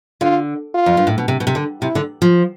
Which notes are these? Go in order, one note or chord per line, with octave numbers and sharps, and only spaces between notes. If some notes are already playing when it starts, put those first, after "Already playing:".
D3 F4
F4
F2
G2
A2
B2
C3
B2
C3
D3
C3 E4
D3
F3